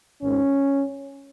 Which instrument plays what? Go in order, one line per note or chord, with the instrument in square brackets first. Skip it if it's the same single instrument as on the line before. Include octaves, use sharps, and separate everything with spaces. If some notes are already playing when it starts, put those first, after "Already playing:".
[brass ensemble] G#1 G#2 D#3 C#4